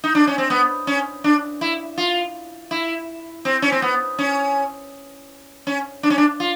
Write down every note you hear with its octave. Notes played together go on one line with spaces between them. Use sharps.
D#4
D4
C#4
C4
B3
C#4
D4
E4
F4
E4
C4
C#4
C4
B3
C#4
C#4
D4
C#4
D4
F4